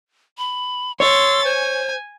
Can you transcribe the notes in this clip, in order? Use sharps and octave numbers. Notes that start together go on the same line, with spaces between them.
B5
C#5 C6 E6 A6
C5 G#5